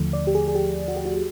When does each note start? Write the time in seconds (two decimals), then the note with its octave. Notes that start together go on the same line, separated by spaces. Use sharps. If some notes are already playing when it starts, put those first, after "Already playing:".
Already playing: D#2 D3 F3 A3
0.13 D5
0.27 G4
0.35 G#4
0.48 G#4
0.55 G4
0.88 F#4
0.96 G4
1.05 F#4